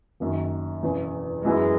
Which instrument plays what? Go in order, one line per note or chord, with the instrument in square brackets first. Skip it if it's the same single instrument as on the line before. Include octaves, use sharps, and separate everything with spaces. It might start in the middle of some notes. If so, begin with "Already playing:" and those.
[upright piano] F#1 F#2 D#3
E1 E2 C#3
[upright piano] F#2 E3 B3 E4 [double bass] G#3